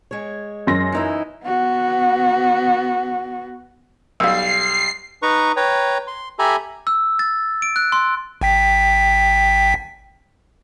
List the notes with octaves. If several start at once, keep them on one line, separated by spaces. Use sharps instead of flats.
G#3 C#5
F#2 C6 A#6
E3 D#4 E4
B3 F#4
B1 G3 F5 E6 C7
D#4 B4 A#5 C#6
B4 C#5 G5 A#5
C6
G4 A4 E5 G#5 A#5 B5
E6
A6
D7
F#6
C6
G#1 G5 B6